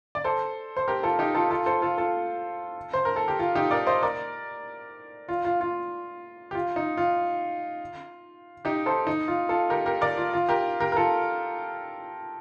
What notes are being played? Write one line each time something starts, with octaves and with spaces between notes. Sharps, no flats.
D5
A4 C5
C5
G4 A#4
F4 A4
D#4 G4
F4 A4
F4 A4
A4 C5
F4 A4
F4 A4
C5
A#4
A4
G4
F4
D#4 G4
A#4 D5
C5 D#5
A#4 D5
F4
F4
F4
G4
F4
D#4
F4
D#4 G4
A4 C5
D#4
F4
F4 A4
G4 A#4
G4 A#4
A#4 D5
F4
F4
G4 A#4
G4 A#4
A#4
F4 A4